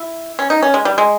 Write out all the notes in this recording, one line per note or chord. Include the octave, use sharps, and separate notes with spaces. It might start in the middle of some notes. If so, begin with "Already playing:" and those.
Already playing: E4
C#4
D#4
C#4
G#3
G3
G#3